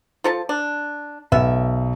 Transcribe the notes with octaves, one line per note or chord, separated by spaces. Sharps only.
F3 A4 A5
D4
B1 B3 E5